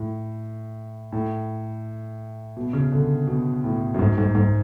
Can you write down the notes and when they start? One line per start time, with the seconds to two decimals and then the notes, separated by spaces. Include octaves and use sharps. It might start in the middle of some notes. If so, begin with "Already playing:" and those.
Already playing: A2
1.12 A2
2.57 B2
2.73 C#3
2.92 D3
3.27 B2
3.64 A2
3.94 F#2
3.99 G#2
4.18 G#2
4.35 G#2